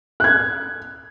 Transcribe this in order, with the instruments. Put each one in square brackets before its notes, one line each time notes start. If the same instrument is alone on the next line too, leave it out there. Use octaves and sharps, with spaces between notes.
[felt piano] F#6 G#6